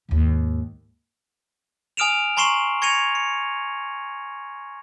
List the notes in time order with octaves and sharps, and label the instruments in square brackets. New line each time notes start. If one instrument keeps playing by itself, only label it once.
[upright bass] D#2 G#2
[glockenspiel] G#5 D#6 F6 D7 E7 F7
G#5 A#5 C6 C#6 C7 E7
C#6 G#6 A#6 C#7 D#7 F7
C#7